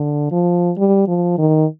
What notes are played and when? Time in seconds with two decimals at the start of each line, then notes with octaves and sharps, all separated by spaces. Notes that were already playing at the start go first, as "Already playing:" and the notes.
Already playing: D3
0.32 F3
0.77 G3
1.07 F3
1.38 D#3